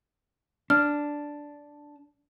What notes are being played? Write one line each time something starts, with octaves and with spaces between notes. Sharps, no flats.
D4 F6